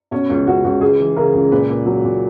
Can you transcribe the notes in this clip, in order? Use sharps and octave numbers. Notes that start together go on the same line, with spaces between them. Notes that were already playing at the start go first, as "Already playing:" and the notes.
B2 C#4
C#2
C#2 F#4
C#2 F#4
C#2 G#4
E3
C#3 A#4
C#2
A#2 B4
A#2
F#3
A#2